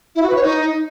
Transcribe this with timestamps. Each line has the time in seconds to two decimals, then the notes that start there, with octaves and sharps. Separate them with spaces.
0.14 E4
0.21 F#4
0.28 B4
0.35 C#5
0.42 D#4